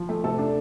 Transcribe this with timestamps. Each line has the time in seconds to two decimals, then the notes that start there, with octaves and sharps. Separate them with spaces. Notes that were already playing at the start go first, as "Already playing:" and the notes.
Already playing: F3
0.09 A3
0.23 C3 A4
0.38 D4